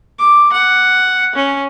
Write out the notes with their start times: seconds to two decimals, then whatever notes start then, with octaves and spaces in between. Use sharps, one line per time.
0.19 D6
0.53 F#5
1.35 C#4